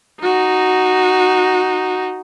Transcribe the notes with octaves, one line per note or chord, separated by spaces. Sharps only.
D#4 F#4